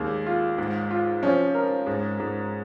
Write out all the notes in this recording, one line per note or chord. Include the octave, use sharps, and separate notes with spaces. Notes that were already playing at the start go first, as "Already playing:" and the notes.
Already playing: D#2 G#3 A#3
F4
G#2
F4
F3 C#4
A#4
G#2
G#2